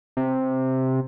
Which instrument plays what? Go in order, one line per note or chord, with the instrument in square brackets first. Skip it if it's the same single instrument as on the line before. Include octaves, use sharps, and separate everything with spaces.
[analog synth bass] C3